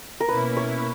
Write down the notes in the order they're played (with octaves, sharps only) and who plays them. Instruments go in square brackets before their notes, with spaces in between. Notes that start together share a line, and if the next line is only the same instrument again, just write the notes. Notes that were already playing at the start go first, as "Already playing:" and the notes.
[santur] A#4
[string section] B2 A#3 C#4 E4 [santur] B4
[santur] C#5